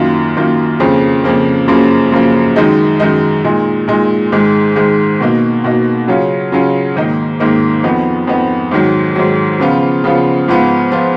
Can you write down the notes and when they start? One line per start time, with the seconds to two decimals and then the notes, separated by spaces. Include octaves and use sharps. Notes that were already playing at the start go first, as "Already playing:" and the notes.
Already playing: F#2 D#3 A#3 F4
0.37 F#2 D#3 A#3 F4
0.80 F2 C#3 F3 A#3
1.24 F2 C#3 F3 A#3
1.68 F#2 C#3 F3 A#3
2.12 F#2 C#3 F3 A#3
2.56 F#2 D#3 G#3 D#4
3.00 F#2 D#3 G#3 D#4
3.44 A#2 G#3 D#4
3.88 A#2 G#3 D#4
4.32 G#2 D#3 G#3
4.76 G#2 D#3 G#3
5.21 B2 A#3 D#4
5.64 B2 A#3 D#4
6.08 C#3 F#3 C#4 F4
6.52 C#3 F#3 C#4 F4
6.96 G#2 D#3 A#3 D#4
7.40 G#2 D#3 A#3 D#4
7.83 F2 F3 B3 D#4
8.28 F2 F3 B3 D#4
8.72 G#2 D#3 F#3
9.16 G#2 D#3 F#3
9.60 C#3 F3 B3 F4
10.04 C#3 F3 B3 F4
10.48 G#2 F3 B3 F4
10.92 F3 B3 F4